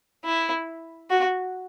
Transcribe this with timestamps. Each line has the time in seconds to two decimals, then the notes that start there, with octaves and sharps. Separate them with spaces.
0.25 E4
1.10 F#4